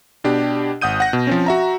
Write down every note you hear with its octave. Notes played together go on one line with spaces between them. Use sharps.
B2 D4 G4
G#1 F#5 D#6 G6 D#7
F#5 A#6
B2
F3 C4 C#4
F#4 E5 A#5